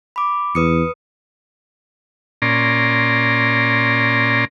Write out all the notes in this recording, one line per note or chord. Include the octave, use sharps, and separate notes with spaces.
B5 D6
E2 B4 D#6 C#7
A#2 C#4 D5 A#5 C6